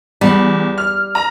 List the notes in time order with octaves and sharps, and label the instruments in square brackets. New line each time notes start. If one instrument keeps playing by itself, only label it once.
[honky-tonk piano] E2 [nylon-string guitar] G3
[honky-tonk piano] F6
A#5